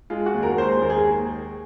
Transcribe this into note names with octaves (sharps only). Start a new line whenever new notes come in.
G#3 F4
F#4
D#2
A#4
G#3 C5
D#2 A#4
G#4